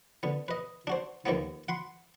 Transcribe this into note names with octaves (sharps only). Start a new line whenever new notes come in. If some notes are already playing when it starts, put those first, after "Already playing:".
D3 B3
B4 D#5
D4 F#4 C5
D#2 D#3 F3 A#3 B3
F#5 B5 C6